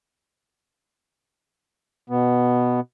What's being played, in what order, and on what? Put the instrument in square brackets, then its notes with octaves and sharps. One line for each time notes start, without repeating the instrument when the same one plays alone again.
[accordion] B2 B3